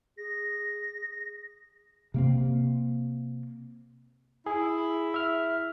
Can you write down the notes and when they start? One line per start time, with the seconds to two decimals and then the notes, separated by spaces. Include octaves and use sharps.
0.17 G#4 A#6
2.14 C3 A#3 C4
4.46 E4 G#4
5.14 E5 F6